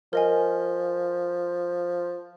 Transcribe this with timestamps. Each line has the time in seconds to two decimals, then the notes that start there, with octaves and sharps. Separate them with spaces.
0.13 F3 A#4 D#5 G#5